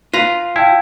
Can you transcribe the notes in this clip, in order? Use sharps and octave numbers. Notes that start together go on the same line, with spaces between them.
F4 B4 A#5
E4 F5 G5 A5